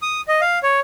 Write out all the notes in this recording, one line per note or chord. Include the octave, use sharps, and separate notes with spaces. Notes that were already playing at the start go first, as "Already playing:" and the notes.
D#6
D#5
F5
C#5